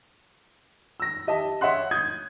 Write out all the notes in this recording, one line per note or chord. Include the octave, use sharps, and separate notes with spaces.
E6 A#6
G4 D#5 E5 A5
C#5 D#5 E5 F#5 C6 F#6
D#6 G6 G#6